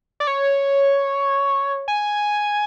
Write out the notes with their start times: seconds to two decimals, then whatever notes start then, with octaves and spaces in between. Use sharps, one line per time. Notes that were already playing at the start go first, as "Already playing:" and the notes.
0.20 D5
0.27 C#5
1.88 G#5